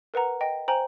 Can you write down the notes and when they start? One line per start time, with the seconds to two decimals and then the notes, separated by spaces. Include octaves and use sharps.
0.14 A#4 B4 F#5 A#5
0.41 D#5 G5
0.68 C5 G5 G#5 A#5 F#7